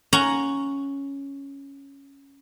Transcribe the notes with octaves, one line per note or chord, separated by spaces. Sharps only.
C#4 F#5 A#5